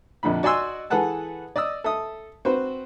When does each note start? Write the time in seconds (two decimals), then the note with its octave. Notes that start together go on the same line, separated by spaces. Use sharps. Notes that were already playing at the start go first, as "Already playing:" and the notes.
0.23 A#1 F2 D3 D4 B5
0.43 F#4 D5 D#5 G#5 C6 E6
0.90 E3 G#4 A4 B4 F#5 A5
1.56 D5 D#5 D#6 E6
1.84 A4 E5 D#6
2.45 C4 F#4 B4 C5